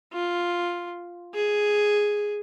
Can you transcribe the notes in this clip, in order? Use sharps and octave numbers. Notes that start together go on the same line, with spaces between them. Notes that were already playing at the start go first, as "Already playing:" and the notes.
F4
G#4